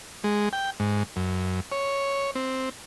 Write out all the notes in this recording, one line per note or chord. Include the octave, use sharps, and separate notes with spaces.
G#3
G5
G#2
F#2
C#5
C4